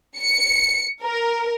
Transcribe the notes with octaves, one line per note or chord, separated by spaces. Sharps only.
C#7
A#4